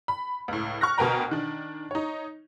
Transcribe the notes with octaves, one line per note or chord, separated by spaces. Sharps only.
B5
C#2 A2
C#6 F6 F#6 A#6
D2 B2 A#4 B4 G5 A#5
D#3 D4
D#4 C#5